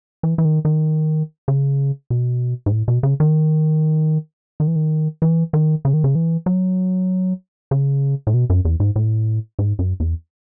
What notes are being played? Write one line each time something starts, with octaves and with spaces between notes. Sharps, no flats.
E3
E3
D#3
D#3
C#3
B2
G#2
A2
B2
C#3
D#3
D#3
E3
D#3
E3
D#3
C#3
D#3
C#3
E3
F#3
C#3
A2
B2
F#2
E2
G#2
A2
G#2
F#2
E2